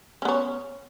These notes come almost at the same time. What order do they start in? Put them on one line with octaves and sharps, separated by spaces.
C#4 B3 C#5